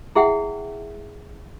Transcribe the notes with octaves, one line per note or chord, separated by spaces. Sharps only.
E4 G#4 E5 F#5 G5